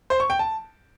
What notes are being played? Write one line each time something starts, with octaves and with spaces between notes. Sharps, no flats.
C5
C#6
G5
A5